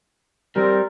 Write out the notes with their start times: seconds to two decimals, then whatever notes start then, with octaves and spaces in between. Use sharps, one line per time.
0.56 G3 C4 A#4